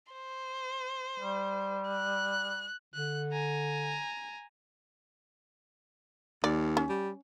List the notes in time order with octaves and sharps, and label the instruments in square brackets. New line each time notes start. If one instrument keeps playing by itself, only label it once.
[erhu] C5
[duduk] G3
[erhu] F#6
[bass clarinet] D3 [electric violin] F#6
[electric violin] G#5 A#5
[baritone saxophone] D#2 [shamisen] D5
[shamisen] C#4
[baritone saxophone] G3